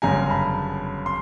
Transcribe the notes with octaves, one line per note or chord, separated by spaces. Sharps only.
G1 F#2 C#3 G#5 A#5
A#5
A5 B5
C6